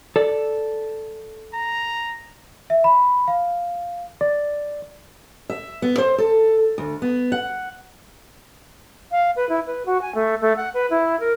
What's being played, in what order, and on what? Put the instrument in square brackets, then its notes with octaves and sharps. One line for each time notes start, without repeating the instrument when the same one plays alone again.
[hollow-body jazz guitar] A4 D5
[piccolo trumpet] A#5
[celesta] E5
B5
F5
[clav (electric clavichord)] D5
[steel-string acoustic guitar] E5
B3
C5
A4
D2
B3
F#5
[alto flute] F5
B4
E4
B4
F#4
G#5
A3
A3
F#5
B4
E4
A#4